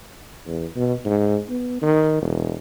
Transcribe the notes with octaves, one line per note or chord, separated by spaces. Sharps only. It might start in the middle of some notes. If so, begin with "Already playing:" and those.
E2
B2
G#2
B3
D#3
E1